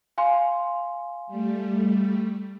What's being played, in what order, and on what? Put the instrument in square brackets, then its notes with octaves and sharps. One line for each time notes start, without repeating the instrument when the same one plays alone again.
[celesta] F5 G#5 C6
[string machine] G3 A3